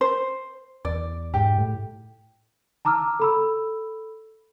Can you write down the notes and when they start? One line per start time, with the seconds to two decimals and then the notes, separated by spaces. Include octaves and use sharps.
0.01 C5
0.85 E2 D5
1.34 G#2 G4
1.58 A2
2.85 A5 A#5 D6 E6 F6
3.20 A4 B5 E6